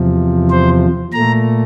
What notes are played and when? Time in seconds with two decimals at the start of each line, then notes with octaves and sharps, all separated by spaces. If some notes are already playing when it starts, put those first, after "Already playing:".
Already playing: E2 C3 F3
0.50 C5
1.13 A#2 A3 A#5